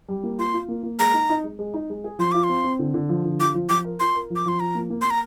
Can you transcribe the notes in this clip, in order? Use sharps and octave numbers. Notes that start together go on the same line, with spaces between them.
G3
A#3
F4 C6
F4
A#3
A#3
G#3 A#5
D#4
D#4
G#3
G#3
D#4
G#3
G#4
F3 C6
F4 D6
C6
C4
C4
D3
D3
F3
D3
F4 D6
F3
F3 D6
A#4
F4 C6
A#4
F3
D6
F3 C6
F3 A#5
A#3
A#3
A#3 C6
A#5